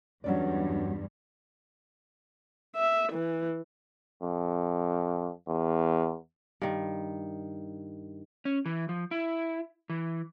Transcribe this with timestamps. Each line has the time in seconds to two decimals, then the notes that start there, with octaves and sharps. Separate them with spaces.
0.24 E2 G2 F#3 G3 C#4 D5
2.76 E5
3.12 E3
4.22 F2
5.47 E2
6.62 G2 D#3
8.45 C#4
8.66 E3
8.89 F3
9.11 E4
9.90 E3